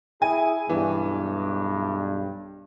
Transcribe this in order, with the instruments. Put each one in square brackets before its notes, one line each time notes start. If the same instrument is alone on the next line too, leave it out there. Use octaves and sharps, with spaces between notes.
[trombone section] E4 G#4 [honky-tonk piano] G#5
[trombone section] B1 G2 [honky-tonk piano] E3